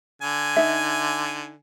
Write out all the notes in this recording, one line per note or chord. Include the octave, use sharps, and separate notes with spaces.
D3 G#5
D#4 E5